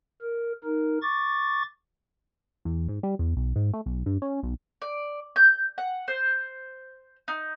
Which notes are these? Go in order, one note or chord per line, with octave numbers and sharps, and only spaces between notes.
A#4
D#4 A#4
C#6 D6 A6
E2
G#2
G3
E2
B1
G#2
A3
B1
G2
C#4
B1
D5
G6
F#5
C5
D#4